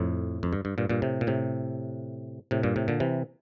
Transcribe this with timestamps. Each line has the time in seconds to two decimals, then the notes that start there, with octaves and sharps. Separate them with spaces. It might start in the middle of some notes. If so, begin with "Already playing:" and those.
Already playing: F2 A2
0.43 F2
0.53 G2
0.65 G2
0.78 G2 A#2
0.90 G2 A#2
1.02 A2 C3
1.21 A#2
1.27 A2 C3
2.51 A2 C3
2.63 G2 A#2
2.76 A2 C3
2.88 A#2 D3
3.00 C3 E3